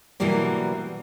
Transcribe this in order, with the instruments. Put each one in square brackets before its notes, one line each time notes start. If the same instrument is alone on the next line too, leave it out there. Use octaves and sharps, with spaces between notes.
[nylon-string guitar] B2 D3 E3 F#3 G3 A#3